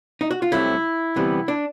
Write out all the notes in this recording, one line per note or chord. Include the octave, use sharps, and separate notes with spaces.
D#4
F#4
F4
C2 C3 D#3 F#3 A3 E4
D2 C3 E3 G3 B3
D4